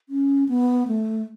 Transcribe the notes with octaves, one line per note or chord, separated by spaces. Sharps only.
C#4
B3
A3